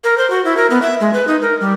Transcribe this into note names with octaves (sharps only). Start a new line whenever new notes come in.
A#4
C5
F#4
E4
A#4
B3
E5
G#3
B4
D#4
A#4
G3